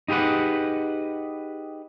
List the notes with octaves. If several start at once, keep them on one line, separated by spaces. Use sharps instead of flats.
D#4 G4 G#4 B4 F#5